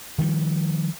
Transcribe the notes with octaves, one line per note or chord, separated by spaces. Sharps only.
D#3 F3 G3